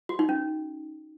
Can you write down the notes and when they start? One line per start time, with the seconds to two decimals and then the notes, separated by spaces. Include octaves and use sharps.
0.09 F#4
0.19 D#4
0.29 C#4